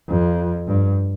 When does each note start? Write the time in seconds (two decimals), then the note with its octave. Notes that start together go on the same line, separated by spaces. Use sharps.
0.09 F2
0.67 G2